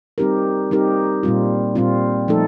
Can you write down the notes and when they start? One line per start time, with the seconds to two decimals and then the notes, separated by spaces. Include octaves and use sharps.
0.18 G3 C4 D#4 G4 A#4
0.71 G3 C4 D#4 G4 A#4
1.23 A#2 G3 C4 F4
1.75 A#2 G3 C4 F4
2.28 F3 A3 D#4 A4